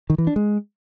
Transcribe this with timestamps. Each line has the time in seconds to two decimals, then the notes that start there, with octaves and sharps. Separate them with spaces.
0.10 D#3
0.18 E3
0.27 D4
0.36 G#3